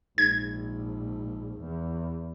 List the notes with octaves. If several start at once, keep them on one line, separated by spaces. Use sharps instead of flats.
A#1 G#2 G#6
E2